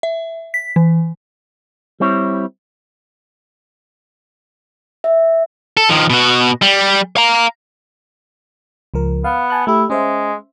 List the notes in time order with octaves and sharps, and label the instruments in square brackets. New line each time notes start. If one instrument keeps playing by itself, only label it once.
[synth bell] E5
B6
E3
[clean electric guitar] G3 C4 E4 C#5
[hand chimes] E5
[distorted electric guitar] A4
D#3 F3
B2 F#4
G3
F5 A#5
[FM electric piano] C#2 F3 A#4
[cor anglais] B3 [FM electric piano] F5
[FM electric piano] G#5 A5 F#6
[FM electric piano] A3 G4 [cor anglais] E4
[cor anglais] G#3 [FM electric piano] C#4 C5 E5